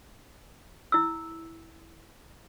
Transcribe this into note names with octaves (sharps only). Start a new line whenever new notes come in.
E4 E6